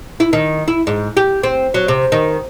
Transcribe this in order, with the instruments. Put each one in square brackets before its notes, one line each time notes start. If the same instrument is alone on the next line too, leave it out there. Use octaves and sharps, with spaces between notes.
[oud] E4
D#3
E4
G#2
G4
C4
F#3
C3
D#3